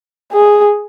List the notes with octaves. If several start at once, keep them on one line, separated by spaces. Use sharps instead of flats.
G#4